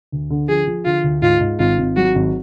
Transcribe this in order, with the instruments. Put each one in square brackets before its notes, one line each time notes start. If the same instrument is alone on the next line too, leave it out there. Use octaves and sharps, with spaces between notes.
[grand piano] D2
D3
[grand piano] F3 [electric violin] G#4
[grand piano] F3
[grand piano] D3 [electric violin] F4
[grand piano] D2
[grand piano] G#2 [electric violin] F4
[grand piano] G#2
[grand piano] G#1 [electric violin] F4
[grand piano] G#1
[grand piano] F#3 [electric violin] F#4
[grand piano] G#1